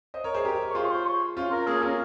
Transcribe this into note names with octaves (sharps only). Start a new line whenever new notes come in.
C5 D#5
A#4 C#5
G#4 C5
G4 A#4
C#5
F4 G#4 C5
C#5
C5
C#5
C#4 F4 C5
A#4
A#3 C#4 G#4
C#4 F4 A#4